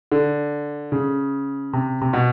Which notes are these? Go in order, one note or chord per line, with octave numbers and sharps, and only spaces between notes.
D3
C#3
C3
C3
B2